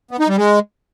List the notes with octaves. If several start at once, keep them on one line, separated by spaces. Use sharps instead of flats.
B3
D#4
G3
G#3